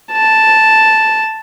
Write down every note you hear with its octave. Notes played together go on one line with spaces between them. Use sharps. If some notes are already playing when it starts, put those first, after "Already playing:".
A5